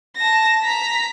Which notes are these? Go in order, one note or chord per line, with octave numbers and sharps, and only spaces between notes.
A5 A#6
A#5 B6